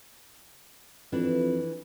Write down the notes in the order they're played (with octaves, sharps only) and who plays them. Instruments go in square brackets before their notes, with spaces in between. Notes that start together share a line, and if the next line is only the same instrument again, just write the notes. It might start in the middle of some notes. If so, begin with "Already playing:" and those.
[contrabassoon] F2 [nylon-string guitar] E3 D4